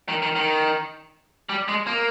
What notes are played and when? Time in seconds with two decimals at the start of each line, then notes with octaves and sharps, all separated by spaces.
0.09 D#3
0.22 D#3
0.36 D#3
1.49 G3
1.68 G#3
1.87 A#3